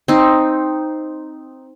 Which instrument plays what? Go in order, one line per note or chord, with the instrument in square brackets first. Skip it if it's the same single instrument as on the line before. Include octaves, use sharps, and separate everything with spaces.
[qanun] C4 D#4